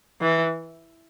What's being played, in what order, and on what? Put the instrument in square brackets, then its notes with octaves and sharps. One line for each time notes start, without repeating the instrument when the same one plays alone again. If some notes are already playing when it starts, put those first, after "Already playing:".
[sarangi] E3